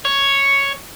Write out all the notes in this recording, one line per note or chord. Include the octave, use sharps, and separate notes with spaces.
C#5